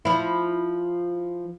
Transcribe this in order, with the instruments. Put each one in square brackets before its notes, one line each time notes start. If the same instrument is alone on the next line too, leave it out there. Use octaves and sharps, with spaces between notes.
[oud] F3 E4